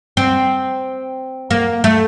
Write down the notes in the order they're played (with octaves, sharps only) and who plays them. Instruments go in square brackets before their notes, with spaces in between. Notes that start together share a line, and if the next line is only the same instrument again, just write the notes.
[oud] C4
A#3
A3